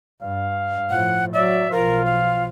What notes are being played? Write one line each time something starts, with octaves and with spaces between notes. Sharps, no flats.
G2 F5
A2 F3 F#5
F#3 D5 E5
B1 F3 F4 A#4
F5